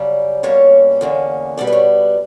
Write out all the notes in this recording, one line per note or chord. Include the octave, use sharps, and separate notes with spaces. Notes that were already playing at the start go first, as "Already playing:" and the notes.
Already playing: F#2 C#3 G3
B2 G3 A#3 C#4 C#5
E2 D3 A#3 C#4
B2 G3 B3 D5
B4
C#5